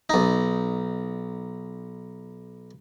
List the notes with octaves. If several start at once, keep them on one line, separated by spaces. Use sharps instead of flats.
B1 D#4